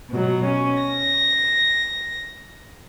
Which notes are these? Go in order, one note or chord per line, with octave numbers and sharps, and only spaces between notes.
B2 F#3
C#4
A#6